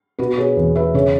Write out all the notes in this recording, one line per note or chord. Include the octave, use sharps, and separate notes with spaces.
B2 F#4 B4
G#4 C#5
E2
B4 E5
C#3 G#4 C#5